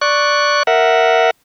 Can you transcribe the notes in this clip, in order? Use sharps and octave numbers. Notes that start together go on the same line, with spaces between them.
D5 C#6 F#6
A#4 E5 F#5